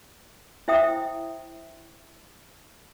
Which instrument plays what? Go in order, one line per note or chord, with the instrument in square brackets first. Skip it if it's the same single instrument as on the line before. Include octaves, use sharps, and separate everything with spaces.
[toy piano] E4 C5 E5 G5 D#6